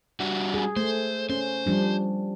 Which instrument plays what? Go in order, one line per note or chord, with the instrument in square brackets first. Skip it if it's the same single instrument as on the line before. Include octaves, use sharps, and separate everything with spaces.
[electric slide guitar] G3 D4 F#4
[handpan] G#4
[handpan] A3 [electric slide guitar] C5
[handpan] C#4 [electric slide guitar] C5
[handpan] F3 G3 D4